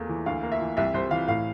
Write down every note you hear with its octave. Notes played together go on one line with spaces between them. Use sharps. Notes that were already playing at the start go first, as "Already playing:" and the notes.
Already playing: E2 A3 A#3
E3
D2 F5
A#3
E5
E3
C2 E5
C2 C5
E3 F5
A2 F5